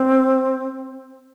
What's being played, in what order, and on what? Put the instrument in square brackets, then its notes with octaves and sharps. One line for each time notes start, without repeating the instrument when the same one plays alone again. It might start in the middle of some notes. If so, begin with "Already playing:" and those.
Already playing: [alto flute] C4